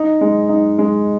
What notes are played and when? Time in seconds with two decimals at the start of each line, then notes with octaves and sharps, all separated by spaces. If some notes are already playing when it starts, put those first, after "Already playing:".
Already playing: D#4
0.21 G#3
0.49 D#4
0.78 G#3